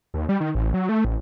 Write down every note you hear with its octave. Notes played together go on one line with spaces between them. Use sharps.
D#2
G3
D#3
A1
F#3
A3
A1